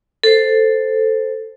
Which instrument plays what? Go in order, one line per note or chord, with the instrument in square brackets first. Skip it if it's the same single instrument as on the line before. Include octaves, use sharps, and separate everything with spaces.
[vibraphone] A4 C5